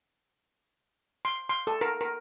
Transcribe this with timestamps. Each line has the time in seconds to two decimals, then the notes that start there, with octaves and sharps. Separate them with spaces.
1.25 C6
1.49 C6
1.67 A4
1.81 A#4
2.01 A#4